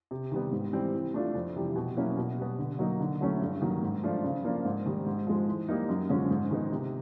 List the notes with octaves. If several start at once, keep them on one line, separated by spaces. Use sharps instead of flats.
C3
D#3 G3 B3
G#2
E3 G3 C4
E3
A3 D4 F4
F2
C3 E3 G3
B2
F#3 A#3 C#4 E4
B2
G3 B3
D3
F#3 A#3 D#4
D3
F#3 A3 C#4 E4
G2
D#3 F#3 A#3
G#2
F3 A3 D4 F4
C#3
F3 A#3 D4 F4
G#2
D#3 G3
G#2
F3 G#3
E3
G3 A#3 D#4
F#2
D3 F3 G#3 C#4
G#2
D#3 G#3 B3 D#4
C3